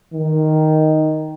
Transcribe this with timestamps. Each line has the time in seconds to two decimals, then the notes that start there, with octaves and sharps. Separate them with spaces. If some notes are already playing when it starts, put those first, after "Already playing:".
0.13 D#3